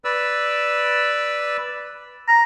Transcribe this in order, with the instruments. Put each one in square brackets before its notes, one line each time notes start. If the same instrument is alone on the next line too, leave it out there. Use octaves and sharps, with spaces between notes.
[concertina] B4 D5 E6
[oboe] A#5